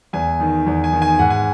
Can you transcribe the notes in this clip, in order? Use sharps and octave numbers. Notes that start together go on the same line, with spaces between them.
E2 G#5
D#3
E2
G#5
D#3
G#5
G#2 F#5
G#5